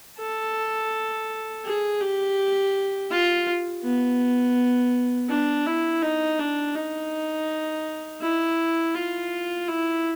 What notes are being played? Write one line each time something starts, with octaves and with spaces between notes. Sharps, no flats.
A4
G#4
G4
F4
B3
D4
E4
D#4
D4
D#4
E4
F4
E4